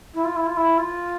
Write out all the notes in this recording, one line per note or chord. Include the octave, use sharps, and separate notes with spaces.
E4
F4
E4
F4
E4
F4